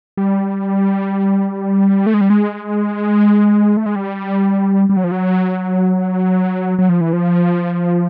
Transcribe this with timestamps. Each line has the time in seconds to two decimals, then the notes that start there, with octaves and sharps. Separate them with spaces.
0.17 G3
2.06 A3
2.14 G#3
2.21 G3
2.30 G#3
3.77 A3
3.86 G#3
3.96 G3
4.89 G3
4.97 F#3
5.04 F3
5.12 F#3
6.79 F#3
6.89 F3
7.01 E3
7.13 F3